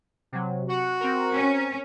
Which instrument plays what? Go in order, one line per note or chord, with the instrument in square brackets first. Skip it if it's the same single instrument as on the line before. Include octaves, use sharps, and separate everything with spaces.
[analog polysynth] C3 F#3
[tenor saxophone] F#4 [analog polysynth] F#5
[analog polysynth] C4 A#4
[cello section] C#4